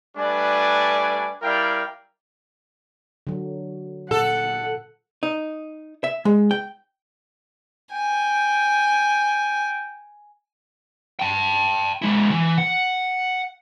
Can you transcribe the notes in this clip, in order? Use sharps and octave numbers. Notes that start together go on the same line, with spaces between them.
G3 A3 D4 B4 D5 G#5
G3 E4 A#4 D5 F5 G5
D3 F#3
A#2 A4 F#5
D#4
E5
G#3
G5
G5 G#5
G5 A5
G#3 E4
E3
F#5